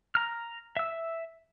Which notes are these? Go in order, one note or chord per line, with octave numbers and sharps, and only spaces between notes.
A#5 F6
E5 E6